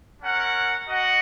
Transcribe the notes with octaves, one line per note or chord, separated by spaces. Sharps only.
C#4 A#4 F#5
F#4 D#5 F#5